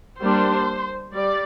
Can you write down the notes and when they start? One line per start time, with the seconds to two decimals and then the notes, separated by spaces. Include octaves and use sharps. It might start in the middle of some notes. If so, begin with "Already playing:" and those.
0.20 G3 A#3 D4 C5
1.13 G3 D5